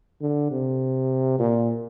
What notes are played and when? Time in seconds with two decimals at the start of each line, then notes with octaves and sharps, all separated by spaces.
0.21 D3
0.50 C3
1.39 A#2